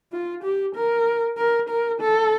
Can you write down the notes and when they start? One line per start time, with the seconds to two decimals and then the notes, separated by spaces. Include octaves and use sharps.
0.13 F4
0.44 G4
0.75 A#4
1.38 A#4
1.69 A#4
2.01 A4